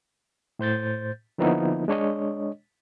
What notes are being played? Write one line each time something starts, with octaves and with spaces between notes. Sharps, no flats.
A2 C5 G6 A6
D3 F3 A#3 B3 D#4 E4
G#3 D4 C#5 D#5